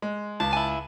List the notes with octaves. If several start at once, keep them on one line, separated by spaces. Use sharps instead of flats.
G#3
C#2 A5
E4 G#5